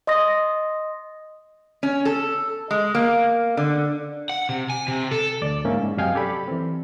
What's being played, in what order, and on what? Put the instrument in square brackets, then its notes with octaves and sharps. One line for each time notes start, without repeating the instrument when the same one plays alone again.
[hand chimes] D#5 C6 D#6 A#6
[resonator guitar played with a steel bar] C#4
A4
G#3
A#3
D3
[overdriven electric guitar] F#5
C3
G#5
C3
A4
[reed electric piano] D2 D5
G#2 A#3 C#4 E5
G#2
F#2 C3 D#5 F5 G5 G#5
G4 A4 D5 B5
E3 C4